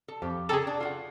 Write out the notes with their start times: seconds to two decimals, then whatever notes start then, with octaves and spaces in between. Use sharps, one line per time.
0.08 A4
0.22 F2 G4
0.49 C#3 G#4 A4 G5 A#5
0.67 D4
0.80 F4 F#4 F#5